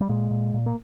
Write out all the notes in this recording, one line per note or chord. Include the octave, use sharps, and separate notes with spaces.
G3
A#2 G#3
A#2
A#2
A#3